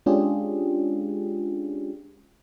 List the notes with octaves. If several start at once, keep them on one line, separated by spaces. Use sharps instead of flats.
G#3 C#4 D4 F4 G4 G#4